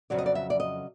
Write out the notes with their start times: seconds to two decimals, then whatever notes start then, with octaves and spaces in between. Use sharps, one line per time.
0.10 F2 C#3 F#3 D5
0.18 D#5
0.26 D5
0.35 E5
0.50 D5
0.60 D#5